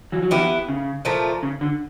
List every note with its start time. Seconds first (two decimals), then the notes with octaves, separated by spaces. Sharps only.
0.12 E3 F#3
0.23 F#3
0.31 D#3 F3 B3 E4 G4
0.68 C#3
1.05 A#2 F3 A3
1.43 C#3
1.61 D3